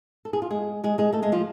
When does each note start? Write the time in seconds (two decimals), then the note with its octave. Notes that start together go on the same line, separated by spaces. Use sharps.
0.25 A4
0.33 G#4
0.42 F4
0.50 G#3 G#4
0.84 G#3 G#4
0.98 G#3 G#4
1.13 A3 A4
1.22 G#3 G#4
1.32 F3 F4